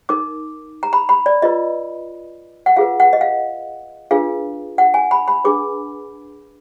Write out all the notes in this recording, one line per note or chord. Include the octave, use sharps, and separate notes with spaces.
D#4 A#4 D6
A#5
B5
B5
D5
F4 B4 D#5
F#5
F4 G#4 B4 F5
F#5
D#5
F5
D4 F4 G#4 B4 F5
F#5
G#5
B5
B5
D4 G#4 B4 D6